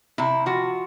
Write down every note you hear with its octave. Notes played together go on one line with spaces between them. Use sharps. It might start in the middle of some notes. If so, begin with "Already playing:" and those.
C3 E4
F3 F#4